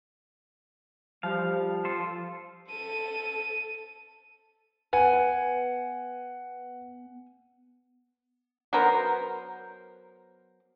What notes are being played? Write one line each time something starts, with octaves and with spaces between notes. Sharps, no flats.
F3 G3 F5
F4 A4 C5
A4 D#7
B3 F#5 G#5
F#3 B3 A#4 C5